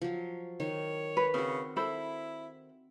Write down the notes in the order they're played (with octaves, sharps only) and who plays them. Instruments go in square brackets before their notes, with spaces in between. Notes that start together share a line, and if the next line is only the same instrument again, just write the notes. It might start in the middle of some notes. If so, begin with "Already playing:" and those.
[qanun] F3 F#3
[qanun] D#3 [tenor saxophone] C#5
[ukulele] B4
[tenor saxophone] C#3 [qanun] C4 F#4
[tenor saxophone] E4 [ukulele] A4 C5 B5